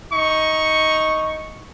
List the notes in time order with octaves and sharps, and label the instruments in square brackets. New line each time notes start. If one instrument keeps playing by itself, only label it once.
[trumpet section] D#4 C#6